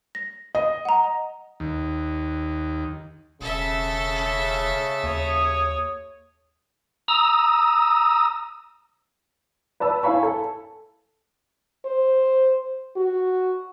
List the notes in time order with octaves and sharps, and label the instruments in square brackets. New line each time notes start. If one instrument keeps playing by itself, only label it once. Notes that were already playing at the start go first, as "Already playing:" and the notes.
[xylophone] A#6
[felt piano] D#5
[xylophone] F#5 A#5
[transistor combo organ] D#2
[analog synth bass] E1 [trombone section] C#3 [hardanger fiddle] A4 E5
[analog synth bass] D#2 [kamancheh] C#5 D#6
[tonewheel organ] A#5 D#6 E6
[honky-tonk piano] B4 D5 A5 E6
E4 C#5 F5 G#5 B5 C#6
A4
[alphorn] C5
F#4